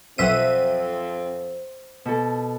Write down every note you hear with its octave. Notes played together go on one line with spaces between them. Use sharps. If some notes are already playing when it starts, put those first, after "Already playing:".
B1 F2 C4 C5 E5 F#5 D#7
B2 A4